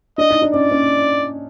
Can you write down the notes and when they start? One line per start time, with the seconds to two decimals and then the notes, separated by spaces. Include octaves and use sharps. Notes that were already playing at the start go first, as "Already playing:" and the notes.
0.18 D4 D#5
0.30 D#4
0.42 D4
0.54 C#4 D5
0.71 C#4